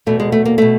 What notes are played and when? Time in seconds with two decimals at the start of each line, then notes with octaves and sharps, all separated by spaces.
0.06 E2 B2 A3
0.20 G#3
0.32 A3
0.45 A#3
0.58 B2 A3